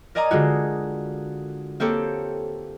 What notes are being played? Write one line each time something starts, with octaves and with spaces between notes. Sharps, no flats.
A#4 D5 D#5 G#5 A#5 D#6
D3 G#3 F4 F#4
A#3 C4 G4 A4 C#5